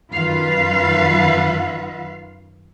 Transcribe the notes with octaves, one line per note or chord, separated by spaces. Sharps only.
F#2 D#3 F4 B4 F5